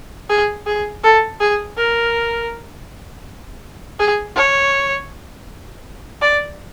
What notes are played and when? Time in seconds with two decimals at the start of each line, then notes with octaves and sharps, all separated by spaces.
0.29 G#4
0.67 G#4
1.03 A4
1.40 G#4
1.77 A#4
3.99 G#4
4.36 C#5
6.22 D5